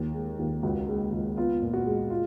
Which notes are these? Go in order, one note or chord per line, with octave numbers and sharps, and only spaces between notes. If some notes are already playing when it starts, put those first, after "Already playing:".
Already playing: D#2
G#3
D#2
C#2 F#4
G#3
C#2
B3 F4
A#2
F#4
G#3
F4